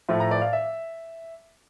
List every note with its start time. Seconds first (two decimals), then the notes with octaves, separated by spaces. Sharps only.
0.09 A2 F3 A3
0.20 A#5
0.31 D5
0.41 F5
0.53 E5